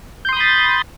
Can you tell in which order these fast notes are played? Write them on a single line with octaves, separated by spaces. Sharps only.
G6 C6 D#6 B5 A6